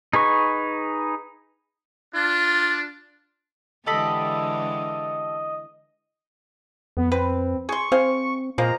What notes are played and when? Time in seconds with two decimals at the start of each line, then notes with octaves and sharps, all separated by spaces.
0.13 D#4 G#4 B4 C#6
2.14 D4 F4
3.86 D3 E3 G#3 G4 A4 D#5 B5
6.97 F2 B3
7.12 C4 B4
7.69 G#4 C6 C#6
7.92 C4 G#4 C5 F5
8.58 A#2 F3 G#3 A#3 A#5